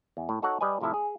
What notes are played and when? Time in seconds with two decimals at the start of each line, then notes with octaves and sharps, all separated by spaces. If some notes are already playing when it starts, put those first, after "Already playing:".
0.17 E2
0.29 A2
0.42 D#4 F#4 A4 C#5 F#5
0.61 G3 B4 D#5 G#5
0.81 A2 C3 F3 E4 A4
0.94 G#4